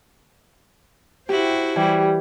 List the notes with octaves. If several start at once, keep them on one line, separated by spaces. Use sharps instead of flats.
E4 F#4 G4 C5
E3 G3 G#5